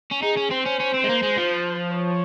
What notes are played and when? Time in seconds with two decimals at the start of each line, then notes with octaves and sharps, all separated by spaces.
0.11 C#4
0.22 D#4 G#4
0.37 C#4
0.50 C4 C5
0.65 C#4
0.80 C#4
0.94 C4
1.04 G#3
1.09 A#3
1.23 G#3
1.37 F3
1.95 C#5